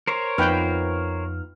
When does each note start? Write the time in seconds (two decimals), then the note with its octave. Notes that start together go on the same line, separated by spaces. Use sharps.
0.07 A#4 C5 C#5
0.38 F2 B3 D#4 F4 B4 G5 F6